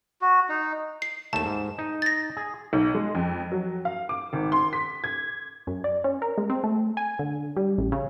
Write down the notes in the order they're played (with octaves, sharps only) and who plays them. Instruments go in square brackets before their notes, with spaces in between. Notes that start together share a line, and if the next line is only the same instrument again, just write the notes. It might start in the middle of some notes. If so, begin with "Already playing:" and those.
[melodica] F#4
D#4
[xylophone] C7
[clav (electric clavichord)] D#2 A3 [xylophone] A5 E7
[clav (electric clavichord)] G#2
D#4
[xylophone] A6 A#6
[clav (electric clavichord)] G#4
[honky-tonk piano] B1
G#3
F2
F#3
F5
D6
G#1
C6
B6
G#6
[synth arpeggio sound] F#2
D5
C#4
A#4
G#3
C4
A3
G#5
D3
G3
A1
C#3